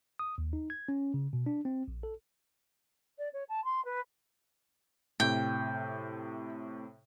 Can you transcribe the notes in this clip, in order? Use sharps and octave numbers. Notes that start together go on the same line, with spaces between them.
D#6
D#2
D#4
G#6
C#4
C#3
B2
D4
C4
A#1
A4
D5
C#5
A5
C6
B4
A2 C3 G5